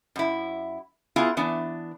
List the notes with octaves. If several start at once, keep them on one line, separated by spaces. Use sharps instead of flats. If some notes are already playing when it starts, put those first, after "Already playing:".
F#2 E4
B3 E4 F4 G#4
E3 B3 D4